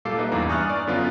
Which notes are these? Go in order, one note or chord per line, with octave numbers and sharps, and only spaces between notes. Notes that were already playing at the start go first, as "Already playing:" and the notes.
A#2 G3 A4 F5 D6 C7
A#3 D#4 B4 D#5 E5
E2 G2 A#5 D6
G#5 C#6 D#6 F6 F#6 A6
D5
F#2 D3 B3 C#4 F4